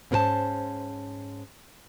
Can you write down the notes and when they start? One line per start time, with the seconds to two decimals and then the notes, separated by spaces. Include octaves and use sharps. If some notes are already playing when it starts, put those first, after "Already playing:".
0.11 G#2 C4 C#4 A#4 C5 A5